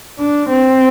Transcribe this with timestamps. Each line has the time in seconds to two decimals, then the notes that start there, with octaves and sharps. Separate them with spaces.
0.19 D4
0.49 C4